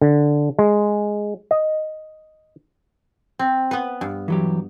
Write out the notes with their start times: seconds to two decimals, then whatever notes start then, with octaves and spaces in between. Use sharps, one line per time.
0.01 D3
0.59 G#3
1.51 D#5
3.39 C4
3.71 B3 B4
4.01 G2
4.28 E3 F#3 G4